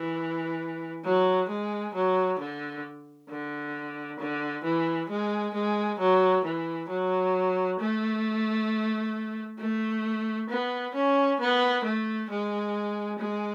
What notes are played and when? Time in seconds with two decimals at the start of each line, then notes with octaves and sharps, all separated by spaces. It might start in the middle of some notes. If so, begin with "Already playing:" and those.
Already playing: E3
1.04 F#3
1.49 G#3
1.94 F#3
2.39 D3
3.29 D3
4.19 D3
4.64 E3
5.09 G#3
5.54 G#3
5.99 F#3
6.44 E3
6.89 F#3
7.79 A3
9.58 A3
10.49 B3
10.94 C#4
11.40 B3
11.84 A3
12.30 G#3
13.19 G#3